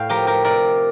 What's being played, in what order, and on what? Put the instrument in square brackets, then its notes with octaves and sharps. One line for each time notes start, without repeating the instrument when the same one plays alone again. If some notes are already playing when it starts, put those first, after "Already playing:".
Already playing: [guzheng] A2 F5 G5
F3 G4 A#4
G4 A#4
C3 A#4 D5